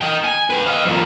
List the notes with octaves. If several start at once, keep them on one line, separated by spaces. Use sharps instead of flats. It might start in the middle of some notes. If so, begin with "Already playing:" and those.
D#5 G5
G#5
B4 G5
D#5 F5
F2 D#3